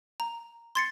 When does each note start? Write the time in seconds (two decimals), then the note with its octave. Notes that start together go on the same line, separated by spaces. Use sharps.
0.20 A#5
0.75 C6 G#6 A6 C7 C#7